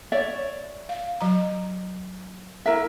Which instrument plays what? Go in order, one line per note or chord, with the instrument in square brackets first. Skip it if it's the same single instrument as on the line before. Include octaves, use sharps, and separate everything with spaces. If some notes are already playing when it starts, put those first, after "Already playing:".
[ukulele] C#5 D5 E5
[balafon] F5
F#3 A#5
[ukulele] E4 A#4 E5